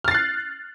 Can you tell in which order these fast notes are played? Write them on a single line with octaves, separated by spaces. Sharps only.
F6 A6 C7 F#6